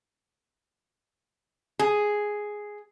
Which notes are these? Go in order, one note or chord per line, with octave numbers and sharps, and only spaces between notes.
G#4